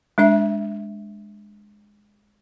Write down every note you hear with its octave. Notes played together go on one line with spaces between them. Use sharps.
G#3 D4 E5